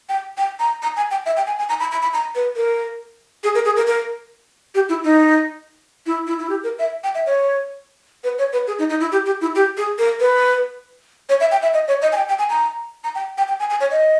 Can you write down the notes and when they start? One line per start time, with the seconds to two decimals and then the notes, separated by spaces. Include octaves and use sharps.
0.09 G5
0.38 G5
0.60 A#5
0.82 A#5
0.97 G#5
1.11 G5
1.26 E5
1.37 G5
1.47 G#5
1.59 G#5
1.69 A#5
1.80 B5
1.92 B5
2.02 B5
2.13 A#5
2.35 B4
2.56 A#4
3.44 G#4
3.55 A#4
3.65 G#4
3.77 A#4
3.87 A#4
4.75 G4
4.89 E4
5.04 D#4
6.06 E4
6.27 E4
6.39 E4
6.49 G4
6.64 A#4
6.79 E5
7.04 G5
7.15 E5
7.26 C#5
8.24 B4
8.38 C#5
8.53 B4
8.67 G#4
8.79 D#4
8.90 D#4
9.00 E4
9.12 G4
9.26 G4
9.41 E4
9.56 G4
9.77 G#4
9.98 A#4
10.20 B4
11.29 C#5
11.40 E5
11.51 G5
11.62 E5
11.74 D#5
11.88 C#5
12.02 D#5
12.12 G#5
12.17 G5
12.29 G5
12.39 G#5
12.50 A#5
13.04 A#5
13.15 G5
13.38 G5
13.48 G5
13.60 G#5
13.70 G#5
13.80 C#5
13.91 D#5